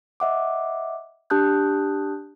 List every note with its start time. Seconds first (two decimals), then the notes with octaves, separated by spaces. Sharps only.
0.20 D#5 E5 F#5 D6
1.30 D4 G4 A5 D#6 F#6 G6